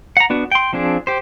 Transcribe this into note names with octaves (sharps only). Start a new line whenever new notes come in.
F#5 A#5
B3 D4 F#4
G5 C6
F3 C4 D4 G#4
G4 C5